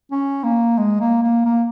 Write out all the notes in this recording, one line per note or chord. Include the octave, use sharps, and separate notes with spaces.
C#4
A#3
G#3
A#3
A#3
A#3